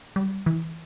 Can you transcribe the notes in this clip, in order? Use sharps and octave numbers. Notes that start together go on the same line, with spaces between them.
G3
E3